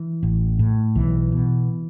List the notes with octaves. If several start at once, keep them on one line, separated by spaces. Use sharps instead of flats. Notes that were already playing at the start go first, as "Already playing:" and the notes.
Already playing: E3
A1
A2
B1 E3
B2